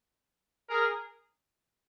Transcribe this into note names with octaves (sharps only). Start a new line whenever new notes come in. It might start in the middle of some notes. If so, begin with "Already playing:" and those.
G#4 A#4